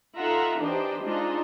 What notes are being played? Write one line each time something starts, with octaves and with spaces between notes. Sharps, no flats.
D#4 F4 A4 E5 F#5 A#5
E3 D4 D#4 G4 C5 D#5
G#3 D4 D#4 F4 D#5